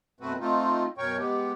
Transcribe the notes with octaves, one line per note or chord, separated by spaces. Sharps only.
F#2 B2 A3 C4 F#4 B4
A3 C4 D#4 F4
F#2 B2 A#4 C#5 G5 C#6
G#3 B3 G4